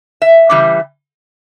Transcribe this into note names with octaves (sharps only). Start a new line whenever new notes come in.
E5
C#3 E3 G3